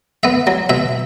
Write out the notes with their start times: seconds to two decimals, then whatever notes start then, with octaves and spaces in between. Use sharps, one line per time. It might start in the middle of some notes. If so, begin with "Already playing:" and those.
0.23 B3 E5
0.47 F#3
0.69 B2 E5